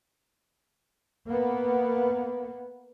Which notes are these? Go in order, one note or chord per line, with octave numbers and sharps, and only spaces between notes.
A#3 B3